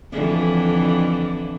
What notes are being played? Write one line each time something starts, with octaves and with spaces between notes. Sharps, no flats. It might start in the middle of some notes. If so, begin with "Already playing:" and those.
F2 D3 E3